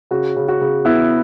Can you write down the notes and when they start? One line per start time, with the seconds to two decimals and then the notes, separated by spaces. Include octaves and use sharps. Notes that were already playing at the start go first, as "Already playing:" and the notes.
0.11 C#3 F#4
0.36 C#3
0.48 F#4
0.61 C#3
0.85 B3 E4